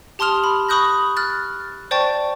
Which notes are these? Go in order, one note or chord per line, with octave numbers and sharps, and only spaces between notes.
G4 A5 C6 D#6 F6 F7
B5
B5 C#6 D#6 F#6 G6 A#6
F6 F#6 A6
C5 D5 G5 A5 C#6 A6